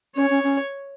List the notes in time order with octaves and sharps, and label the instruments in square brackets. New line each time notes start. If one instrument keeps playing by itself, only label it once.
[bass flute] C#4 [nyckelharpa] C#5
[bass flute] C#4
C#4